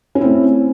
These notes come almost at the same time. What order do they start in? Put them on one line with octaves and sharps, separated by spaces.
C#4 E4 C4 A3